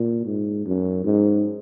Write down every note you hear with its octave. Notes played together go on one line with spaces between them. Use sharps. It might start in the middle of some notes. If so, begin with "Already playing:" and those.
Already playing: A#2
G#2
F#2
G#2